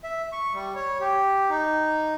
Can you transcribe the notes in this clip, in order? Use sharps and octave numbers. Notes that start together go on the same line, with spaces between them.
E5
C#6
G3
C#5
G4
D#4